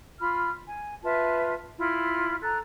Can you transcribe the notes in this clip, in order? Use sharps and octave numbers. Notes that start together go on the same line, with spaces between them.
F4 B5 F6
G#5
F4 B4 E5 A5
E4 F4
A4 A#5 F#6